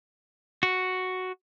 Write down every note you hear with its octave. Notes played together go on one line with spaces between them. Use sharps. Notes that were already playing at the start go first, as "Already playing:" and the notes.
F#4